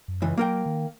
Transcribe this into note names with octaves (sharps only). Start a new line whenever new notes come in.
F#2
C#2 E3
F#3 A#3 A#4 G5
D#3